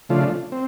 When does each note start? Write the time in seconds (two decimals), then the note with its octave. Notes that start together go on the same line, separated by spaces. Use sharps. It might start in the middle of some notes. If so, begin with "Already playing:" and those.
0.09 C#3 F3 A3 D4 F4
0.52 C4